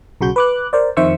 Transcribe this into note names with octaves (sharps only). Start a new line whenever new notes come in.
B1 C#3 F#4 G6
B4 D6 F#6
A#4 C5 D5
F2 D#3 C5 E5 C#6 E6